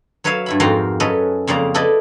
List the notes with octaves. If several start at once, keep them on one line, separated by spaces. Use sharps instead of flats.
F#3 B4 C#5 E5 F5
G2 E4 B5
F2 G#2 F#4 A#4 F5 G5
F#2 C#4 A4 B4 D#5
F2 C#3 A#3 D5 A#5
E4 A4 B4 D5 D#5